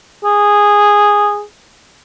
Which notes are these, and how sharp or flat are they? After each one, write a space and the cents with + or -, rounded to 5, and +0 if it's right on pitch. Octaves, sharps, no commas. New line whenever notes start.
G#4 -10